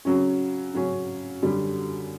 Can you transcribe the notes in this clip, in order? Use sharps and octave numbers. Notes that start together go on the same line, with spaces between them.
C#3 F#3 C#4
C#3 F#3 C#4
F#2 D3 G3